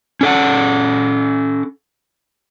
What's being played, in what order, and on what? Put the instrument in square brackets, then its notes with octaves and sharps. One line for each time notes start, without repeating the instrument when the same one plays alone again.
[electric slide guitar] C#4 A4 F#5